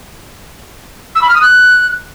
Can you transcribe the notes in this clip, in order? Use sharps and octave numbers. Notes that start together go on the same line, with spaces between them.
E6
B5
F6
D#6
F#6